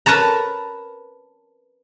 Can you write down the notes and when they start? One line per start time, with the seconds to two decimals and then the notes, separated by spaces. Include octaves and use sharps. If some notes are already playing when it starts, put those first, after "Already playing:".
0.06 A#4 B4 C#5 A5 A#5